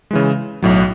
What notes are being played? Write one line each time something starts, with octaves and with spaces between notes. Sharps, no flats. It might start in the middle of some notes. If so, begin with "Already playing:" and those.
C#3 E3 G#3
B1 A2 F#3